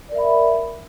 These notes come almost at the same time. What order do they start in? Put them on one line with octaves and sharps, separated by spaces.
D5 A#4 E5 B5